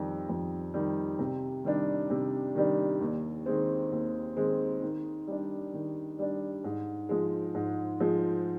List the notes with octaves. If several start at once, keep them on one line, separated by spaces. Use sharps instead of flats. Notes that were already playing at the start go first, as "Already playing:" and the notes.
Already playing: F2 D#3 G3
F2
D#3 G3
C3
D#3 G3 D4
C3
D#3 G3 D4
D#2
D#3 G#3 C4
D#2
D#3 G#3 C4
D#3
G3 D4
D#3
G3 D4
G#2
F3 G#3
G#2
F3 G#3